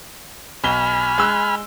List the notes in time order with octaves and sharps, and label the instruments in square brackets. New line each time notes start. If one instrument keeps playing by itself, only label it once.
[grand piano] B1 G7 [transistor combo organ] G#5 B5 F6
[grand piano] G#3 E6 F#6